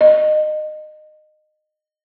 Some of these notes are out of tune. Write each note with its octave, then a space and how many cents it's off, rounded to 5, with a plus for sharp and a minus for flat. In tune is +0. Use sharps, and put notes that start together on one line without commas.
D#5 -25